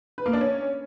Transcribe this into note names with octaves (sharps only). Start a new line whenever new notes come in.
B4
A#3
D4
C#4